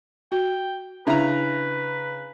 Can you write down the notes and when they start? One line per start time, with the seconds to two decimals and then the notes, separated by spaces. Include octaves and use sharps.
0.32 F#4 G5
1.07 C#3 D4 E4 B4 E5 A#5